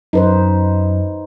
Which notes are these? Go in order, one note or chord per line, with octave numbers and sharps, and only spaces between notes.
F#2 D#4 B4 C5